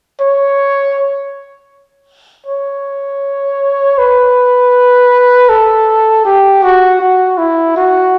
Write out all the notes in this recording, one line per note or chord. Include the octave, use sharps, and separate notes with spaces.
C#5
C#5
B4
A4
G4
F#4
F#4
E4
F#4